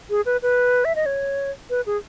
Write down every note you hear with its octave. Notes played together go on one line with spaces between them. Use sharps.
G#4
B4
B4
E5
D#5
C#5
B4
G#4